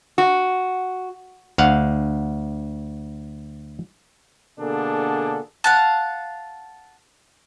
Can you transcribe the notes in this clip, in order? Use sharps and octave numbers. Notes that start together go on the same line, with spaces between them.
F#4
D2 F5 F#5
B2 D3 A#3 D4 G#4 A4
F5 F#5 A5